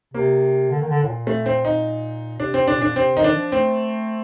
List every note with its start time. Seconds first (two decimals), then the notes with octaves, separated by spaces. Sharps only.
0.14 C3 A#3
0.71 D3
0.81 D#3
0.89 D3
1.04 A2
1.08 A#2
1.27 A3
1.46 C4
1.65 D#4
2.39 C3 D4
2.54 C3 C4
2.68 D4
2.77 A#2
2.82 D4
2.96 C3 C4
3.15 D#3 D#4
3.24 D4
3.34 F3
3.52 A3 C4